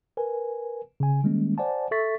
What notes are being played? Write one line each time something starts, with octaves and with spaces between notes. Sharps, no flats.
A#4 B4 G#5
C#3 G#5
D#3 G3 G#3 A#3 C#4
C5 D5 F#5 G#5 A5
A4 E5 C#6 A6 B6